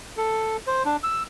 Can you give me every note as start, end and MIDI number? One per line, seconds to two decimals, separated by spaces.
0.17 0.57 69
0.67 0.83 72
0.85 0.96 62
1.03 1.23 88